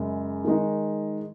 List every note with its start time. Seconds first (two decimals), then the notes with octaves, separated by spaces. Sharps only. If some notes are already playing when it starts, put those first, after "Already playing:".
Already playing: F#2 C#3 G#3
0.45 D#3 G#3 D#4